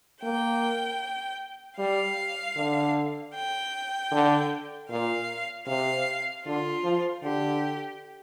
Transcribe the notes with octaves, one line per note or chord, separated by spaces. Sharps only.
A#3 G5
G3 F5
D3
G5
D3
A#2 F5
C3 F5
D3 F4
F3
D3 G4